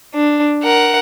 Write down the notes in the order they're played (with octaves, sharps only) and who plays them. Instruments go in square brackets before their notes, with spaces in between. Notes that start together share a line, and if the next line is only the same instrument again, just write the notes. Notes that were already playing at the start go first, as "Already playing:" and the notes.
[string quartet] D4
A#4 F#5